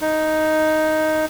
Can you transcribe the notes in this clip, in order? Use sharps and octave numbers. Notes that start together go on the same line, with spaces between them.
D#4